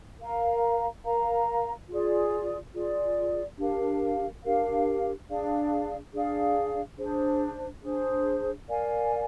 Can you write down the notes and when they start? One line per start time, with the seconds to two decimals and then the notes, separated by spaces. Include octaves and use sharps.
0.19 A#4 F5 A#5
1.05 A#4 F5 A#5
1.89 F4 G#4 D5
2.74 F4 G#4 D5
3.58 D4 G4 A#4 F5
4.43 D4 G4 A#4 F5
5.28 D4 G#4 D5 F5
6.13 D4 G#4 D5 F5
6.98 D4 G#4 C5
7.83 D4 G#4 C5
8.68 A#4 D5 F5 G#5